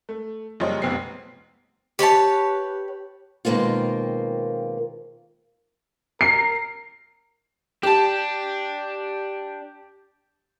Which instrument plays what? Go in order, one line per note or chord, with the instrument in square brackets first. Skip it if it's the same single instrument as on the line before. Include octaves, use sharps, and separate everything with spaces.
[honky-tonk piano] A3
F#1 F3 G3 C#5 D#5 C6
F1 B1 B3 C4 C7
[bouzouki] G4 B4 C#5 A5
[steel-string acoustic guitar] B2 D#3 G#3 A#3 C4 F4
[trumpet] A#4 [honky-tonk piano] C7
[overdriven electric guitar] D4 [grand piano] G4 A5